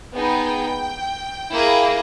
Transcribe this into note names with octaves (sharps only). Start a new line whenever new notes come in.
B3 D#4 G#4 G5
A#3 E4 G#4